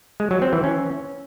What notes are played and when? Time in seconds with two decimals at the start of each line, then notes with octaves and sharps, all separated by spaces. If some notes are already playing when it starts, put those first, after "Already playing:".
0.20 G#3
0.31 F#3
0.42 C4
0.53 E3
0.64 C#4